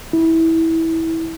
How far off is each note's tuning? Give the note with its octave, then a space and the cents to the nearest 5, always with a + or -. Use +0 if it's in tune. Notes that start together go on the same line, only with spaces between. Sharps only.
E4 -20